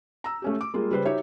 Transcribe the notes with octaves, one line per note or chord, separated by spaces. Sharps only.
A#5 E6
A3 C#4 G4
D6
G3 G#3 A#3 F4
C#3 G3 B4 C5
D#4 F#4 G4 C#5 E5